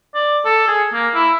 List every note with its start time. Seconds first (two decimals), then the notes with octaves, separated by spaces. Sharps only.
0.14 D5
0.45 A4
0.68 G#4
0.93 A#3
1.14 E4